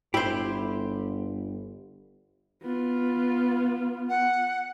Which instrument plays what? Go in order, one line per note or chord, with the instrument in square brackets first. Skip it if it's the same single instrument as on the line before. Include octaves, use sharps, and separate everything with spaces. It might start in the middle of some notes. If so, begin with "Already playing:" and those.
[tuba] G1 [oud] E4 [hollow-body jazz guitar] G4 C5
[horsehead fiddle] B3 F4
[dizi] F#5